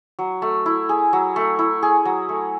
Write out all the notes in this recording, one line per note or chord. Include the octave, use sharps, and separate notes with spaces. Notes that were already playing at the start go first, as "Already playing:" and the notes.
F#3
A3
E4
G#4
F#3
A3
E4
G#4
F#3
A3